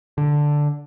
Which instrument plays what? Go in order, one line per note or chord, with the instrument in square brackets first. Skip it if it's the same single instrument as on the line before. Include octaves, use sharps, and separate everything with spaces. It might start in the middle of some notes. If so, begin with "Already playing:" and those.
[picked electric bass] D3